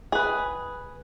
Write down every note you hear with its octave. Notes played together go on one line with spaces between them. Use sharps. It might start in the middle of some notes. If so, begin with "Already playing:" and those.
G#4 B4